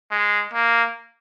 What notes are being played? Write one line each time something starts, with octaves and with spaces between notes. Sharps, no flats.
G#3
A#3